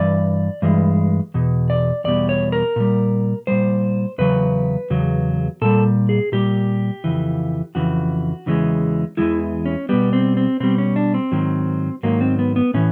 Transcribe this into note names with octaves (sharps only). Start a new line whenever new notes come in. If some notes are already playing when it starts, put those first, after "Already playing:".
Already playing: G2 E3 D5
G2 E3 G#3
E2 B2
D5
E2 B2 G3 D5
C#5
A#4
A#2 G3
A#2 G3 C5
E2 C#3 F#3 B4
E2 C#3 F#3
A#2 G3 A4
G#4
A#2 G3 G4
F2 C#3 E3
F2 C#3 E3 F#4
E2 C#3 E3 G#3
E2 C#3 E3 G#3 E4
C#4
B2 G3 B3
C4
C4
B2 G3 C4
C#4
D4
C4
G#2 D#3 F#3
G#2 D#3 F#3 A#3
C4
B3
B3
A2 E3 C#4